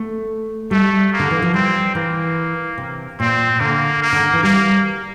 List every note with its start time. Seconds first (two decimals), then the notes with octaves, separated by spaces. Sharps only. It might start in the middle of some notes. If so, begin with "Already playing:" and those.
Already playing: A3
0.71 G3 A3
1.13 A#3
1.20 D3
1.31 E3
1.42 F3
1.54 G3 C4
1.95 E3 A#3
2.78 C3
3.20 A#2 C4
3.60 D3 A#3
4.02 A#3
4.13 D3
4.23 D3
4.33 E3
4.43 G3 A#3